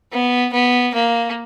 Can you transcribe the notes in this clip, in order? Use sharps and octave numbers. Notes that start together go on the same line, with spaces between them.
B3
B3
A#3